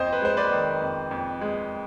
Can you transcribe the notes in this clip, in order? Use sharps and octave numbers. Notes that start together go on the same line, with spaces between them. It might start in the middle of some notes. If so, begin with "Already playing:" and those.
Already playing: F2 C5 D#5
B4
G#3 C5
B4 D5
D#3
F2
F2
G#3